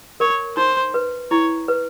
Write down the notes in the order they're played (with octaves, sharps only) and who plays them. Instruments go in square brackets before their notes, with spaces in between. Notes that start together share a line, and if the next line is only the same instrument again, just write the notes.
[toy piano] A#4 [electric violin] C#5
[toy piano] D#4 [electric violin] C5
[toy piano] B4
[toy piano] E4 [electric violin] C#5
[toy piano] B4